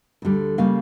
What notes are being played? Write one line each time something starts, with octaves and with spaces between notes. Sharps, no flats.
D2 D3 G3
C#3 G3 A#3 F5